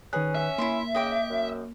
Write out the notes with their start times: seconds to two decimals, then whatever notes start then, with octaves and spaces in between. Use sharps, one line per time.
0.13 D#3 C#4 G#4 B4 F#6
0.35 E5
0.58 A#3 E4 F4 C6
0.95 C#3 D#5 G5 D6
1.30 F#2